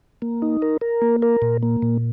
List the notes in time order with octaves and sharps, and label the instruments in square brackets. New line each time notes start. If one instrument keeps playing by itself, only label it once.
[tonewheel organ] A#3
D#4
A#4
A#4
A#3
A#4
A#2
A#3
A#2